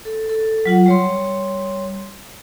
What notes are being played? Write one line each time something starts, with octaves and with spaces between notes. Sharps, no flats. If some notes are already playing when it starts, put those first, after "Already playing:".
A4
A4
F#3 F4 F#5
G3 C#5 C6